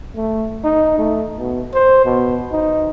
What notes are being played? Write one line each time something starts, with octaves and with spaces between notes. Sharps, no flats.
A3
D#4
A3
B2
C5
B2
D#4